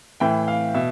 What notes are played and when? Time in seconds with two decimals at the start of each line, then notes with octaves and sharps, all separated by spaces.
0.20 A2 E3 G5
0.48 F5
0.74 B2 E5